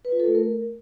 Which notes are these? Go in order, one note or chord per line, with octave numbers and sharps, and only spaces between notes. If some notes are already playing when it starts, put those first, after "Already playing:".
B4
F4
A4
A3
A#4